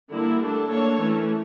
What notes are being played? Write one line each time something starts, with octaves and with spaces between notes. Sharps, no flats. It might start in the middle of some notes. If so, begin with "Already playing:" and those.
D3 G3 A#3 E4 A#4
A3 D4 A4
A#3 D4 A4 C#5
E3 A3 C#4